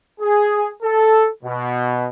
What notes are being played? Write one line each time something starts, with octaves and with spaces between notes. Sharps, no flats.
G#4
A4
B2